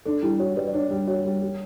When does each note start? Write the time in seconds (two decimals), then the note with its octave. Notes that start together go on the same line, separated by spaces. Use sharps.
0.06 D4 A4
0.23 G3 E4
0.39 F#4 C#5
0.56 G3 B4 D5
0.67 D5
0.73 D4 C#5
0.90 G3
1.07 F#4 C#5
1.25 G3
1.42 G3